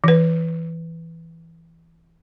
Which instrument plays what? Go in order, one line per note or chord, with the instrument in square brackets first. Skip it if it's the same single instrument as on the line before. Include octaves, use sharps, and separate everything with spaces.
[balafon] E3 B4